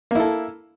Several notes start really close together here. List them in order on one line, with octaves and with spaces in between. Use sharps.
A#3 E4 A4